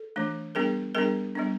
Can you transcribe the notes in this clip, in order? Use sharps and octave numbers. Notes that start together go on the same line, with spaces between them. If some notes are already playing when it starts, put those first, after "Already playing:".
Already playing: A4
E3 A3 D4
G3 B3 D4 G#4 A#4
G3 B3 D4 G#4 A#4
G3 B3 D4